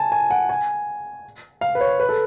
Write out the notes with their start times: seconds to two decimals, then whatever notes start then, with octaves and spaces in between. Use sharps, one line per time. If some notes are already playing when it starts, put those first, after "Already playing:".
Already playing: G#5 A5
0.12 G#5
0.30 F#5
0.49 G#5
1.61 F5
1.75 B4
1.81 C#5
2.00 B4
2.09 A4